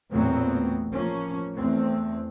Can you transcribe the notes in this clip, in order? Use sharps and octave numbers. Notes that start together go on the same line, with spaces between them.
A1 E2 A#2 F#3 B3 C4
F3 A#3 C#4
E2 A3 C4